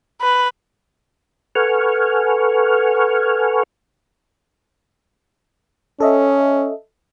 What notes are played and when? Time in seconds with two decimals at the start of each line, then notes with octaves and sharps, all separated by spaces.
0.22 B4
1.55 A4 B4 F#5 G#5 C#6 F6
6.00 C#4 A4 D#5 E5